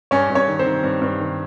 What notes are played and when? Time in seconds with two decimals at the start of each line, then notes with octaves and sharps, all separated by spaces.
0.11 G2 C#4 C#5
0.30 G2
0.35 C#4 C#5
0.48 D#3
0.59 C4 C5
0.65 D#3
0.83 G2
1.02 G2
1.20 D#3